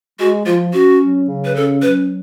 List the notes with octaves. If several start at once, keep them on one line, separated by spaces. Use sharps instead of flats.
G#3 F#4
F3 F4
C#4 F#4
F#3
C#3
B4
C#4 A4
F#3 B4